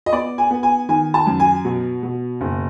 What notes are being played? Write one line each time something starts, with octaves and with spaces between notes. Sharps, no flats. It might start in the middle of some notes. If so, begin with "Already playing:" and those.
D#5
B3 D5
G#5
B3
G#5
D#3 G#5
A5
F#2
G#5
B2
B2
F#1